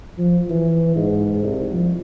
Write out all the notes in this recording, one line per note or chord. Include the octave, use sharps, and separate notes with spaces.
F3
E3
G#2
C2
F3